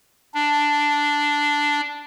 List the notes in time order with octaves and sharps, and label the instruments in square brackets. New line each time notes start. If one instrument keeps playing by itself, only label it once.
[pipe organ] D4